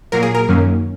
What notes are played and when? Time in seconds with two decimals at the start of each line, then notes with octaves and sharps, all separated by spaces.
0.12 A#2 F#3 A#3 A#4
0.23 G#4
0.35 A#4
0.48 F#2 D#3 F#3 A#3 C#4